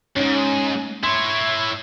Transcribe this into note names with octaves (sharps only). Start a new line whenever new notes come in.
F2 G#2 C#4 D#4
E4 C#5 C6